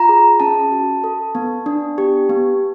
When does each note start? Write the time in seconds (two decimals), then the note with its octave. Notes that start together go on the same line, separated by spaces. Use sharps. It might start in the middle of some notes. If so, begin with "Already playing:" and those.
Already playing: F4 A#5
0.09 G#4
0.40 C#4 A5
0.72 F#4
1.04 A4
1.35 B3
1.66 D4
1.98 G4
2.29 B3